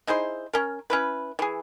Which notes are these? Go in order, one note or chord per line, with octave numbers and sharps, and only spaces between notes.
D#4 E4 G#4 C5
C#4 A#4
C#4 E4 B4
E3 G#4